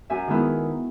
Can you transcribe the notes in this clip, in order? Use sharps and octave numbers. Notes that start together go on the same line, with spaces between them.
F#2 E5 G#5
D#3 G#3 B3 E4